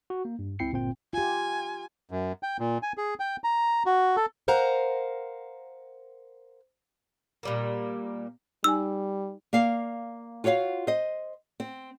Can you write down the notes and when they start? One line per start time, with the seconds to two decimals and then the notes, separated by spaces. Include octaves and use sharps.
0.10 F#4
0.25 A#3
0.39 G2
0.59 C#2 C4 E4 G5 C7 C#7
0.72 G1 A#2 C4 G5
1.13 F4 G4 G#5
2.11 F#2
2.43 G5
2.60 A#2
2.83 G#5
2.98 G#4
3.20 G5
3.44 A#5
3.86 F#4
4.17 A4
4.48 A#4 C5 F5 F#5 A#5
7.43 A#2 G3 A#3
8.64 G3 D#4 G#5 E6
9.53 A#3 D5 F5
10.44 F4 F#4 C#5 D5 F5
10.87 C5 D#5
11.60 C4